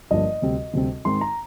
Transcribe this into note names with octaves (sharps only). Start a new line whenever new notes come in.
G1 G2 F3 A#3 D#5
D2 C3 G3 C4
D2 C3 G3 C4
G#2 D#3 G#3 C4 D#4 C6
A#5